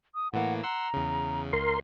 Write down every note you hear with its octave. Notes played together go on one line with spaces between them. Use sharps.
D#6
A2 E3 A#3 F#5
F#5 A#5 C6 E6
E2 C#3
C#2 A#4 C6